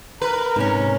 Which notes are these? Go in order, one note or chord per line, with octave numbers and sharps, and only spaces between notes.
A#4 B4
G#2 C3 C#4